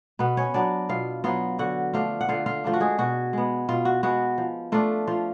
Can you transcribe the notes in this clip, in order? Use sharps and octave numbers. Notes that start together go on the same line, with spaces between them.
B2 B3 B4
C#4 C#5
F#3 B3 D4 D5
B2 F4 F5
F#3 B3 F4 F5
D3 F#4 F#5
F3 A3 D4 F4 F5
F#5
D3 F4 F5
F4 F5
F3 A3 D4 F4
F#4
G#3 G#4
B2 F#4
G#3 B3
B2 F4
F#4
G#3 B3 F#4
F3
A3 D4 F4
F3 F4